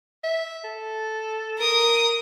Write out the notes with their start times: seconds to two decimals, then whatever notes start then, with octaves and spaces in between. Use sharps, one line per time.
0.24 E5
0.64 A4
1.58 A#4 D#6